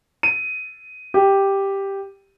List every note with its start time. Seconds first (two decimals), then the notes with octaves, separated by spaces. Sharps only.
0.23 D#7
1.14 G4